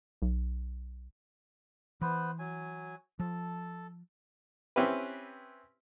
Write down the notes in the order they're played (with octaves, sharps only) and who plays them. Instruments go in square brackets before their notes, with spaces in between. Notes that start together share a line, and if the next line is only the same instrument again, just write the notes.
[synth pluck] B1
[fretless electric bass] E3 [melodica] B3 B4 C5
[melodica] F#3 G#5
[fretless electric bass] F3 [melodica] A4 A5
[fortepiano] C4 C#4 E4 G4 B4